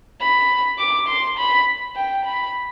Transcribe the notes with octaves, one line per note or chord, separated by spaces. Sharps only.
B5
D6
C6
B5
G5
B5